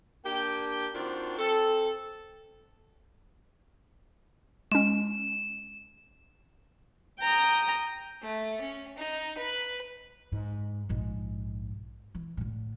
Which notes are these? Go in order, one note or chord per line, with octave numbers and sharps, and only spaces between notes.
A#3 D4 G4 G5
D#3 C4 D4 F4 F#4
C4 A4
G#3 C#4 E7
G5 A#5 D#6
A3
C#4
D#4
B4
G#2
A#1 G#2
E3
A2 D3